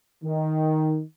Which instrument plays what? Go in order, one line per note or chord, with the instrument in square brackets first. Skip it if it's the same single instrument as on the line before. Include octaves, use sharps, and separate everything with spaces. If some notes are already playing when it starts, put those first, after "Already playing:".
[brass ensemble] D#3